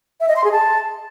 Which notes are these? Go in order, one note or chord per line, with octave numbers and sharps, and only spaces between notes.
E5
D#5
C6
G#4
A5